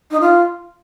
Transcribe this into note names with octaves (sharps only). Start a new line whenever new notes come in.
D#4
F4